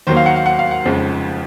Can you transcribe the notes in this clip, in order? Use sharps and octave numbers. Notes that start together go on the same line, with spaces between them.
D#2 D#3 F#3 A#3 C5
F5
F#5
F5
F#5
F5
F#5
F1 F2 C#3 F3 G#3